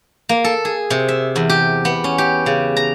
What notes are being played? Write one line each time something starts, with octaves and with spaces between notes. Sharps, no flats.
A#3
A4
G#4
C3
E5
E2
G4
B3
C#4
G4
C#3
A#5